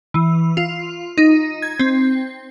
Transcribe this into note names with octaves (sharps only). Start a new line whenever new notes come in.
E3
F4
D#4
G#6
C4